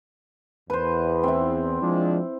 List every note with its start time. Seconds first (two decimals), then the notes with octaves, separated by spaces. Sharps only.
0.70 E2 B4 C5
1.23 C4 E4
1.82 F3 G#3 D4